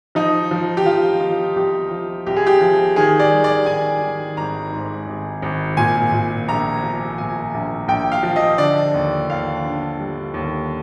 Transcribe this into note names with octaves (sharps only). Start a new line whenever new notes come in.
F3 D#4
F3
G4
F3 F4
F3
C2 G4
F3
C2 G4
G#4
G4
F3
D#3 G#4
D5
G3
D5
D#3 G#5
D#3
G#1 A#5
G#2
G#1
G#1
A#2 G#5
A#2
A#1 A#5
F3
A#2 G#5
A#1
A#1 G5
F5
F3
D#5
D3 D5
D#2
D#2 F5
D3
G3
D#2